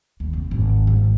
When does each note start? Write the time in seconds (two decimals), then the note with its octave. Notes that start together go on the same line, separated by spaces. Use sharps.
0.20 D#2
0.33 F1
0.51 G#1
0.87 G#2